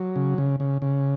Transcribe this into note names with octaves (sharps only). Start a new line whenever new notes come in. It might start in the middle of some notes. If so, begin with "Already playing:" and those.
Already playing: F#3
C#3
C#3
C#3
C#3